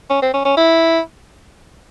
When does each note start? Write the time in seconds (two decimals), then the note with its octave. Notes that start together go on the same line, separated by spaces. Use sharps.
0.10 C#4
0.22 C4
0.33 C#4
0.45 C#4
0.57 E4